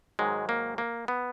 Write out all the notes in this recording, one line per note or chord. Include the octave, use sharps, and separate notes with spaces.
G#2 D#3 F#3 G#3
A#3
A#3
B3